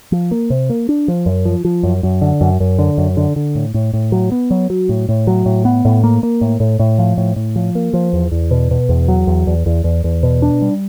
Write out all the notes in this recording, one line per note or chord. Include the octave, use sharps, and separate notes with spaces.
F3
A#3
C3
A#3
D4
F3
F#2
F3
F3
F#2
F#2
D3
F#2
F#2
D3
F#2
D3
D3
A2
A2
A2
F#3
B3
F#3
F#3
A2
A2
F#3
A2
B3
A2
A#3
A#3
A2
A2
A2
F3
A2
A2
F3
A#3
F3
E2
E2
B2
B2
E2
F#3
E2
E2
E2
E2
E2
B2
D4
G3